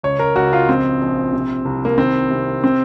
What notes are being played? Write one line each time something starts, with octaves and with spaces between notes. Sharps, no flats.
C#2 C#5
A#4
C#2 F#4
F4
A#1 C4
A#1
C3
C2
A#3
D#3 C4
C3
C4